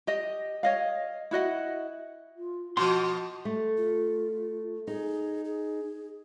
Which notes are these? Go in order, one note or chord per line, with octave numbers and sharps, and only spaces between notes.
G4 D#5
C#5 D#5 F5
E4 F#4 D#5 F#5
F4
B2 F3 F#4 F#5 C6
A3
F4
D#4 G#4
G#4